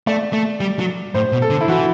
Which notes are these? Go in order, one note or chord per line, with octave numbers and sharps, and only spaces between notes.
A3 D5
A3
G3
F#3
A2 C5
B2
A4
D3
E4
E3 F#4